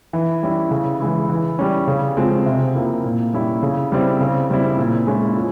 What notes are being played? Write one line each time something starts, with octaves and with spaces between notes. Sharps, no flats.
E3
G3 C#4 E4
C#3
E3 G#3 E4
E3
G3 C#4
C#3
F3 G#3 C4
C3
F3 A#3 E4
A#2
G3 C#4 E4
C#3
G3 C4 E4
C#3
G3 C4 E4
A#2
G#3 C#4 E4
F3